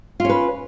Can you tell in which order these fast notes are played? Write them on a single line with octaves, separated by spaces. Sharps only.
F4 C#4 B4